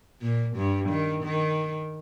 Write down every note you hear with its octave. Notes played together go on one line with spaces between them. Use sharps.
A#2
G2
D#3
D#3